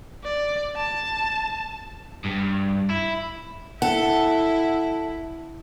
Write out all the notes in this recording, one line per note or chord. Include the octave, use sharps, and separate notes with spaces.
D5
A5
G2
E4
E4 A4 F#5